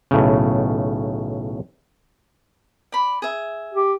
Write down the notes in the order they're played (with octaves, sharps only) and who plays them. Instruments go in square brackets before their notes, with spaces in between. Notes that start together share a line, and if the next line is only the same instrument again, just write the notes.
[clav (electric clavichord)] B1 A2 C#3
[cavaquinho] D5 B5
G#4 E5
[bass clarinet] G4